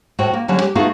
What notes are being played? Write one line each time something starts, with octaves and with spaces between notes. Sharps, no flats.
A2 F#4 C5 G5
A#3
D3 F#3 G3 C#4
G4
A3 B3 D#4 F4 F#4 G#4